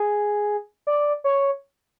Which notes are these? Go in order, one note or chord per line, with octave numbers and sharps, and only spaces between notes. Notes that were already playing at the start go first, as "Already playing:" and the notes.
Already playing: G#4
D5
C#5